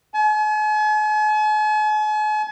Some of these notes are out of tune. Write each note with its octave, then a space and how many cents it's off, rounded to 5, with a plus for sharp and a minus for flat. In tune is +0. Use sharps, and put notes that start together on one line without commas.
G#5 +45